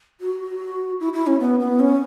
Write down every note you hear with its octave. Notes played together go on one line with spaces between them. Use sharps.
F#4
E4
E4
C#4
B3
B3
C#4